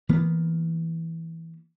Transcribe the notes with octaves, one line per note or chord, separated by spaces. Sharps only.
E3 A#3 B3